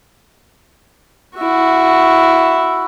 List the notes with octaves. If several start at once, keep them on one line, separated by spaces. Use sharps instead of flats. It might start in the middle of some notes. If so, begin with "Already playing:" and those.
E4 F#4